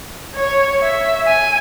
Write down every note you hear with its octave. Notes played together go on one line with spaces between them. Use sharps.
C#5
E5
G#5